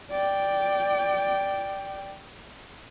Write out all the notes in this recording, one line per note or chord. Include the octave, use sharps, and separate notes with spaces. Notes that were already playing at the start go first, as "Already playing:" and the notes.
D5 G5